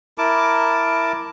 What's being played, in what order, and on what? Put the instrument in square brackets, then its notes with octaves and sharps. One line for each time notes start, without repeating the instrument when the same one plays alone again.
[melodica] E4 A#4 A5 D6